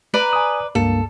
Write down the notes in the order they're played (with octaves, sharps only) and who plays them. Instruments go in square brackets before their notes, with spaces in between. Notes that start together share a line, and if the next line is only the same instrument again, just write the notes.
[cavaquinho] B4 D5 A#5
[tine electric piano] G#5 D#6
[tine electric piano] C#2 G2 A#3 [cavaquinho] A4